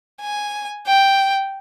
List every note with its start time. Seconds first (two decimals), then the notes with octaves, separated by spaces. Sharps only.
0.21 G#5
0.87 G5